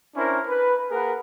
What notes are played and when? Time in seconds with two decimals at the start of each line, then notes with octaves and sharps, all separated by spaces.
0.15 C#4 D4 E4 A#4 C5
0.47 B4
0.91 A#3 G#4 A#4 B4 F#5